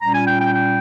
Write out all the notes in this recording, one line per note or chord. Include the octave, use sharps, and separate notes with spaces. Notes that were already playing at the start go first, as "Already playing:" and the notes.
A#2 G3 C#4 A#5
G#5
G5
G5
G5